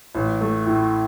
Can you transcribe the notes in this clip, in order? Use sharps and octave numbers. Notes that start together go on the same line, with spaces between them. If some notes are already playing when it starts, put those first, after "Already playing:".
A1
A3
A2